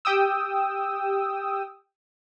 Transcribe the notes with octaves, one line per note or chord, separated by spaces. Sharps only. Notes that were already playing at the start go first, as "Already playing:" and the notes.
G4 G5 D#6 E6